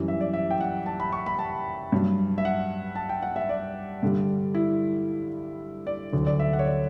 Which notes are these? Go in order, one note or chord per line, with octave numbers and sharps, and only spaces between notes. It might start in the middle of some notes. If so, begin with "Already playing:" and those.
Already playing: F#2 E3 G3
E5
D5
E5
G5
F#5
A5
B5
C#6
B5
A5
G2 F#3
E5
F#5
A5
G5
F#5
E5
D5
G2 D3 G3
E4
D5
D2 D3 F#3
D5
E5
F#5
C#5
D5